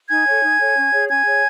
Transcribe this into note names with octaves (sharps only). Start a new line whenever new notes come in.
D#4 G#5 G#6
A4 C#5
D#4
A4 C#5
C#4
G#4 C#5
C#4 G#5 G#6
G#4 C#5